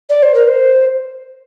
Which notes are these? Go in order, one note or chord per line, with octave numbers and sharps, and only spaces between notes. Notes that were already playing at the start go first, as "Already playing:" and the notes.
D5
C5
A#4
C5